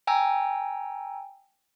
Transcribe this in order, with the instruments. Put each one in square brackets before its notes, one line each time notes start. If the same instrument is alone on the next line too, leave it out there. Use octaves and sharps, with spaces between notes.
[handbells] G5 G#5 A#5 E6